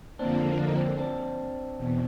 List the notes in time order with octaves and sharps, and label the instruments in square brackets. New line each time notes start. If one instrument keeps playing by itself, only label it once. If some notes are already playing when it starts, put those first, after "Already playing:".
[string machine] F2 D3 F3 A#3 [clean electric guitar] C4 D4
[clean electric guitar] D4
D#4
C4 D4
C4 D4
[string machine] E2 B2